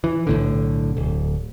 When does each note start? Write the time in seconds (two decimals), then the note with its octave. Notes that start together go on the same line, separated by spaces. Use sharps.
0.04 E3
0.27 B1 A2 D3
0.97 D1